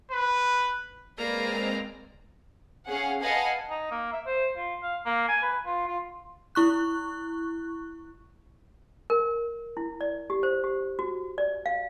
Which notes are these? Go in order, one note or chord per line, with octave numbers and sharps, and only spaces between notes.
B4
G#3 A#3 C4 B4 D5 A#5
C#4 G#4 F5 F#5
B4 D#5 F5 F#5 G#5 A5
D#4
A#3
E5
C5
F4
F5
A#3
G#5
B4
F4
F4
E4 C#6 F#6
A#4
E4
D5
G4
C5
G4
F#4
D5
F5